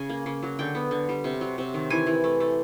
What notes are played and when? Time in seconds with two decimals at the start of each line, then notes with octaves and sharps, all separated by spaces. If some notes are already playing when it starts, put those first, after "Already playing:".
Already playing: C#3 G#5
0.09 A#3
0.26 C#3
0.43 F#3
0.59 D3 G5
0.75 B3
0.91 D3
1.09 G3
1.24 C3
1.41 F#3
1.58 C3
1.74 D#3
1.90 E3 G#5
2.07 E3
2.24 A3
2.40 A3